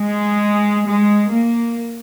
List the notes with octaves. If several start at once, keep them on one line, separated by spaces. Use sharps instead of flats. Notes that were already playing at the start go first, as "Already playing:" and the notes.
Already playing: G#3
G#3
A#3